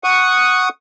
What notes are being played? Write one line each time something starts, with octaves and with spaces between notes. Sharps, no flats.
F#5 C#6 D#6